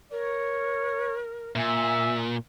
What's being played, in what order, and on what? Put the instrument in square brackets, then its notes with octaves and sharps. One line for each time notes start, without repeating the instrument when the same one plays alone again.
[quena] A#4 [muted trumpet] C#5
[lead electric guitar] A#2 [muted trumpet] E5 [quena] G#5